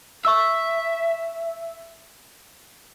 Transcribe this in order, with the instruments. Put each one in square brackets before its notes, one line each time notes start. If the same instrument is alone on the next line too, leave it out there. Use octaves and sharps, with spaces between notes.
[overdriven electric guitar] E5 [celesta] C#6 E6